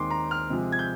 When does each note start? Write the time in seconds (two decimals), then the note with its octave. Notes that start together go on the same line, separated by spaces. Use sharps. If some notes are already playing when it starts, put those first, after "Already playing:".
Already playing: D#2 D#3 G#3 C4 C6 D6
0.10 A#5
0.31 F6
0.50 C3 F3 G#3
0.72 G#6
0.79 G6